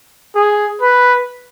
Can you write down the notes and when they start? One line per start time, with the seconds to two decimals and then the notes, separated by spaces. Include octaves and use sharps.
0.36 G#4
0.82 B4